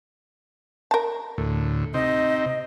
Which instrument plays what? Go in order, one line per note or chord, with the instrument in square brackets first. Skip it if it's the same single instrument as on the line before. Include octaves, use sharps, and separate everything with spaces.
[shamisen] A#4 A5
[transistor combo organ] D2 A2
[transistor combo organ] C3 C4 D#4 [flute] D#5